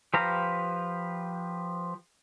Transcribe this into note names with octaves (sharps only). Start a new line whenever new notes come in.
F3 G4 B4 F5 A#5